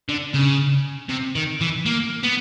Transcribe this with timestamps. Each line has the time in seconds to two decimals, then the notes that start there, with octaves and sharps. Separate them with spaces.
0.09 D3
0.34 C#3
1.09 C3
1.35 D#3
1.61 E3
1.86 A#3
2.24 B3